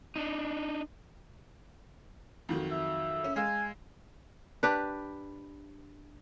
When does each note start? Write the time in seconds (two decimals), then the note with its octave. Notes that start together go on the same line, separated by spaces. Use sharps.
0.16 D4 D#4
2.49 F2 D#3 F#3
2.71 E5
3.24 C#4
3.36 G#3 F5 G#5 E6
4.63 D4 G4 B4